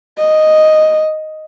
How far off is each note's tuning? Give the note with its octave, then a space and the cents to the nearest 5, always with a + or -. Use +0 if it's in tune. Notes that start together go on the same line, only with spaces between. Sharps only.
D#5 +0